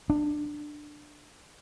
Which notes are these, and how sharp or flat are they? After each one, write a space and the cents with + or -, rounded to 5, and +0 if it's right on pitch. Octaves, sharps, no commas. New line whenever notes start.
D4 +15